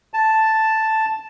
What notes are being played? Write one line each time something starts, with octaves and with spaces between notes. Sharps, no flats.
A5